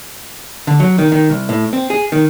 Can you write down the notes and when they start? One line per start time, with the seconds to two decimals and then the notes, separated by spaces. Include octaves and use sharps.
0.67 D3
0.80 F#3
0.98 D#3
1.12 D#3
1.30 C2
1.49 A2
1.73 C4
1.90 G#4
2.12 D#3